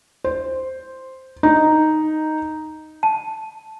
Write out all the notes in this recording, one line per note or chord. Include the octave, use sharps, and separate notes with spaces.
C5
D#4
A5